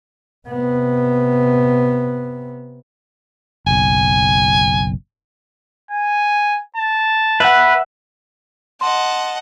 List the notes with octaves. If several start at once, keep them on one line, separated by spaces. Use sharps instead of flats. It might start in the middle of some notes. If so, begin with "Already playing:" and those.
C3 B3
F#1 B1 G#5
G#5
A5
B4 E5 F#5
D#5 F#5 A5 C6